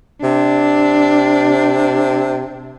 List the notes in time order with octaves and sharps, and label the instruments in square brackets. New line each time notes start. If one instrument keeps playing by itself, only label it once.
[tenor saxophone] C3 [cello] D4